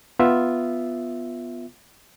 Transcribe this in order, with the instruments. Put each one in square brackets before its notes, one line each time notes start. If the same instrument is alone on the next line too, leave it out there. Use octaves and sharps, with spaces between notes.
[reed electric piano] B3 F4 E5